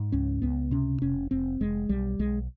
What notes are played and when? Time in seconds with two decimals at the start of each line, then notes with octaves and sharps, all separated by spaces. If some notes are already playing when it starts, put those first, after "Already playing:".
Already playing: G#2
0.12 C#2 C#4
0.42 C#2 B3
0.71 C3 C#4
1.02 F1 C#4
1.31 F1 C4
1.61 F1 G#3
1.89 B1 G3
2.19 B1 G#3